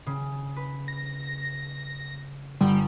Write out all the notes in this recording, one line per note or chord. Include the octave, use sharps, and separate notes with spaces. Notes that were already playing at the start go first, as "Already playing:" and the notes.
C#3
B4
A#6
G1 D3 G3